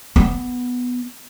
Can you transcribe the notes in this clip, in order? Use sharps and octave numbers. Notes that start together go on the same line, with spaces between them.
B3